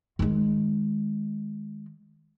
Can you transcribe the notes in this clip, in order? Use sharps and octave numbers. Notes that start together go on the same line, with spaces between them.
D#3 G#3